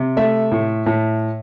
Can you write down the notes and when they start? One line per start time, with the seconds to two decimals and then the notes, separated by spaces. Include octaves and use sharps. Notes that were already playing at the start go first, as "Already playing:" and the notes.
Already playing: C3
0.17 A3 E5
0.52 A2
0.86 A2